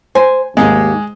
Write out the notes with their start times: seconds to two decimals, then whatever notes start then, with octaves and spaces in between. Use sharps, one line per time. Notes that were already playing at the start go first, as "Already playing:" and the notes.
0.15 C5 G#5
0.57 D#2 G#2 G#3 D#4 G4 F5